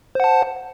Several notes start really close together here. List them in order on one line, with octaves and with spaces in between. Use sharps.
C5 F#5 A5